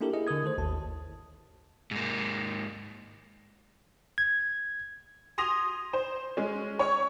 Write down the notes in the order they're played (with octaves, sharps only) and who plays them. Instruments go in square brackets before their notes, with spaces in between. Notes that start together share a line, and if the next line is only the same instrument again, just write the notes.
[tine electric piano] A#3 D4 E4 G4 A4 A#4
E4 G#4 D#5
D3 A4 A#4 D#6 G#6
D#3 A3 A4 C5
G#1 D#2 A5
[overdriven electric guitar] G#2 A#3
[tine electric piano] G#6
[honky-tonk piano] C6 D#6 A#6 F7
C5
G#3 C#4
C#5 C#6